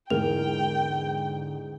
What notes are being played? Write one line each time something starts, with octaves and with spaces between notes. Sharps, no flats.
E2 G#2 D3 E3 A#4 G5 F7